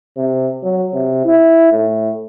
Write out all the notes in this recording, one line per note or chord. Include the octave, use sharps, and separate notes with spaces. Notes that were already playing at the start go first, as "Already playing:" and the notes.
C3
F#3
C3
E4
A2